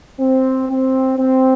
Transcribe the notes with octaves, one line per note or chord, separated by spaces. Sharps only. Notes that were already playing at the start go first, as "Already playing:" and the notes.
C4
C4
C4